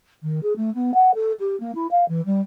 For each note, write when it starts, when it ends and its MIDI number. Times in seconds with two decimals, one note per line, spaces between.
0.23 0.40 51
0.43 0.53 68
0.56 0.73 57
0.74 0.91 59
0.94 1.11 78
1.14 1.32 69
1.39 1.58 67
1.60 1.72 58
1.75 1.87 64
1.91 2.05 77
2.09 2.24 52
2.25 2.41 55